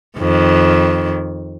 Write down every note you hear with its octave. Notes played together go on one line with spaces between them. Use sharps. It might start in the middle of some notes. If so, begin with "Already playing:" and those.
F2 D#3